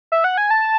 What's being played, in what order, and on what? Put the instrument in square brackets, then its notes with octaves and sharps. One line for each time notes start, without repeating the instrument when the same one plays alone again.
[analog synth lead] E5
F#5
G#5
A5